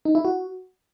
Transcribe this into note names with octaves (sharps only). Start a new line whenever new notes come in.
D#4
E4
F#4